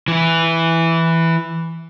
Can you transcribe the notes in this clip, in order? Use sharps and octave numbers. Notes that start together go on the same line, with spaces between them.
E3 E4